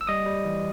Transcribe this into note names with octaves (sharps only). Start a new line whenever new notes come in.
E6
G3 D#5 D#6
G3
E3